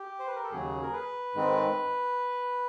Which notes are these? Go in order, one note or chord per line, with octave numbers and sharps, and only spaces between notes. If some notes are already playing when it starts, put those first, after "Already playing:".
Already playing: G4
C5
B4
A#4
A4
D#2 C#3 F#3 G#4
A#4
B4
G#2 D#3 G#3 C4